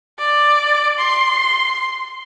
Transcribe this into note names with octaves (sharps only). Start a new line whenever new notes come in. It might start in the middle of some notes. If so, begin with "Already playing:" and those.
D5
C6